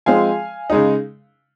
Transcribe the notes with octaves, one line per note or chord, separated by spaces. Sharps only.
F3 G#3 C4 F5 G#5
C#3 G#3 D#4